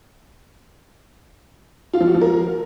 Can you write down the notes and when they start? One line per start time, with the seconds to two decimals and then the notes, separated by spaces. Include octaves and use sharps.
1.93 F4
2.00 F3
2.07 F#4
2.14 F3
2.21 A#4